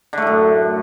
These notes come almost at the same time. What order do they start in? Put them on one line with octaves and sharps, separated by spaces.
D3 A3 A2 F#2